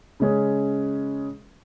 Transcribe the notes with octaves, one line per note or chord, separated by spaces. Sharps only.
C#3 G#3 C#4 G#4